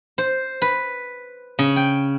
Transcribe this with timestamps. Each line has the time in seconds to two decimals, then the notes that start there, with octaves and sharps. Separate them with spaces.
0.18 C5
0.62 B4
1.59 C#3
1.76 G5